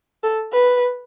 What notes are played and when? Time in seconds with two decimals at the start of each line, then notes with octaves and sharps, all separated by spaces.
0.23 A4
0.53 B4